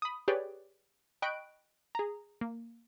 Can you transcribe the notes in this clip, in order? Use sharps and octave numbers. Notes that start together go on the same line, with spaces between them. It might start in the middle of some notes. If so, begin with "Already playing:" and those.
B5 D#6
G4 G#4 B4 C#5 D5 G5
D#5 G5 B5 C#6 F#6 D7
G#4 A#5
A#3